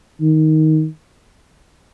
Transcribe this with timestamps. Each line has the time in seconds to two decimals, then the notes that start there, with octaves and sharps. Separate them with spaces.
0.21 D#3